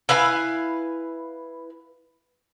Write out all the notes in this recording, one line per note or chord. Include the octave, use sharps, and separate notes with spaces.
E4 B4 F5 G#5